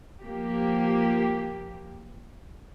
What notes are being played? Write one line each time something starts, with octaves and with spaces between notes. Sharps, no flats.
F3 A#3 G4